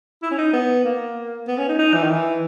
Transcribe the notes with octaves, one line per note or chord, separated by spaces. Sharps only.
E4
C#4
D#4
B3
A#3
B3
C#4
D#4
D#4
E3
D#3
E3